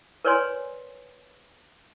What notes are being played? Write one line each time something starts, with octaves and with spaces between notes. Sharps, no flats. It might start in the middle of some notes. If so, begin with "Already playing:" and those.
A#4 B4 C#5 D5 G#5 C6